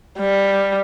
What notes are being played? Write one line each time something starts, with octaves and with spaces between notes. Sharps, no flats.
G3